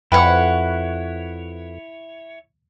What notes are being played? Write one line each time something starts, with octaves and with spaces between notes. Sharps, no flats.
F2 E4 B4 C#5 F#5 G5 B5